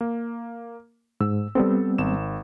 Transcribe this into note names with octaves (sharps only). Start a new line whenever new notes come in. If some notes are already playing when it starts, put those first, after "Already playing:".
A#3
G#2 E6
G3 B3 C4 A4 C5
G#1 E7